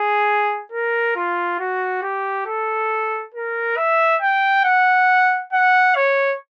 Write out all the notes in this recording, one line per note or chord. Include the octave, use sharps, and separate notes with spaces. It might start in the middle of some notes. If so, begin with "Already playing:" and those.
Already playing: G#4
A#4
F4
F#4
G4
A4
A#4
E5
G5
F#5
F#5
C#5